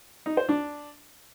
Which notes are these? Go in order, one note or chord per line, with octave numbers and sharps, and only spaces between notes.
D#4
C5
D4